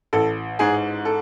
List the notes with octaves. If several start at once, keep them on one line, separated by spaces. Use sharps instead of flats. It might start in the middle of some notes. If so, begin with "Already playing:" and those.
A1 A4
G#2 G#4
A4